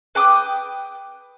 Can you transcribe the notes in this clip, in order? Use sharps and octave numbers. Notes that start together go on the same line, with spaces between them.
B4 G5 D6 D#6